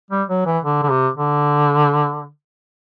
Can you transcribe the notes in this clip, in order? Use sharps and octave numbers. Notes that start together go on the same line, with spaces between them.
G3
F#3
E3
D3
D3
C3
D3